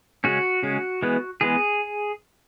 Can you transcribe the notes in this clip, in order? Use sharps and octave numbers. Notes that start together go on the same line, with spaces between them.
C#3 G#3 C#4 F#4
C#3 G#3 C#4
E3 G#3 B3
E3 G#3 B3 G#4